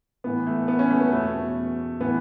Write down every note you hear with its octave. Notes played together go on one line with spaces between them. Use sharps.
A2 E3 B3
A3
B3
C#4
A3
B3
E2 B2 A3
A2 E3 B3